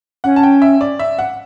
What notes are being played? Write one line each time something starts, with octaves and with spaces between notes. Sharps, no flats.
C#4 F#5
A5
G5
E5
D5
E5
F#5